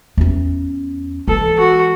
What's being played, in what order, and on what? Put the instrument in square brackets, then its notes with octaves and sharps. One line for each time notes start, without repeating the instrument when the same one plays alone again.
[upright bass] E2 C#4
[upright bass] E3 G#3 [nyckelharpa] A4
[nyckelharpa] F#4